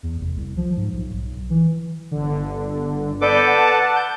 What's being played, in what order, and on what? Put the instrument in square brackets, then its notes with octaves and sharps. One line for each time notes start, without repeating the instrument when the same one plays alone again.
[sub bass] E2
F1
C2
F3
G#2
B1
B1
E3
[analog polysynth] G1 D3
[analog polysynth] B3 D5 G6 [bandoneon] A4 B4 D6
[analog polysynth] F#5 A5
[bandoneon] G6